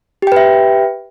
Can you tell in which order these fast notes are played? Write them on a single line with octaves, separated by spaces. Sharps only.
G4 G5 B4 E5